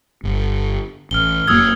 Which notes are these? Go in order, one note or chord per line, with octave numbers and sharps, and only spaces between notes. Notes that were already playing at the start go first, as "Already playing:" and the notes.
G1
A1 F6 G7
F1 F#2 A#3 D#6 E6 G#6